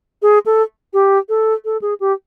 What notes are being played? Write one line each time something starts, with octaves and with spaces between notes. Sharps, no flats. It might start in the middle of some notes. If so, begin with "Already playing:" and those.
G#4
A4
G4
A4
A4
G#4
G4